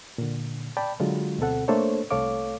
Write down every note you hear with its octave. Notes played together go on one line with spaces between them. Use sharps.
A#2 D3
D5 G5 A5 B5
D3 F#3 G#3 F4 F#4
D2 B2 C4 A4 F#5
A3 A#3 D4 A4 C5 C#5
C2 A3 A4 C#5 F5 D6